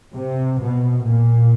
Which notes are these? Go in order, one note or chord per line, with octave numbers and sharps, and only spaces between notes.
C3
B2
A#2